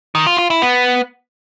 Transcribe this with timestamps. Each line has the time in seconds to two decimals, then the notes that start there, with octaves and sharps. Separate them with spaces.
0.15 D#3
0.27 F4
0.38 F4
0.50 E4
0.62 B3